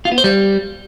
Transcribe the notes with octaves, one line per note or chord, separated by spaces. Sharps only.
F4
B3
C5
G3